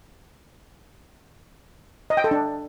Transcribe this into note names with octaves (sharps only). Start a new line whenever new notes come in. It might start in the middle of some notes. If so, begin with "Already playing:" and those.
D#5
G5
A4
D4